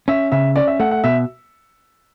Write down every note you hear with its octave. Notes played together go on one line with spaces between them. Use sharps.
C#4 E5
C#3 E5
C#4 D5
E5
A3 F#5
F#5
B2 E5